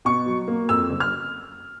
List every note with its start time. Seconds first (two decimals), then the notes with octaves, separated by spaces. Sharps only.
0.05 B2 C#6
0.26 F#3
0.48 A#3
0.69 F2 E6
0.90 F#1
1.00 F6